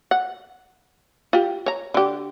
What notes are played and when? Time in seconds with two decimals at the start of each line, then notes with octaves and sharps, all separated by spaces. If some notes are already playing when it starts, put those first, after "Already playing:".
0.11 F#5
1.33 F4 G4
1.66 C#5 A#5
1.94 D3 G4